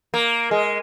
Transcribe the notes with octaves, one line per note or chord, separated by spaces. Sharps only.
A#3
G#3